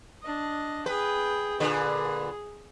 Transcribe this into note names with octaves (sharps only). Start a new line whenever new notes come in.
D4 D#5
G#4 B4 G5
A#2 D3 G#4 B4